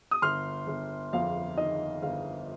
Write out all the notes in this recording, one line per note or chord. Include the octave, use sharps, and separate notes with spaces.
D#6
G1 C6 F6
G1
F2 F5
D#3 D#5
G1 F5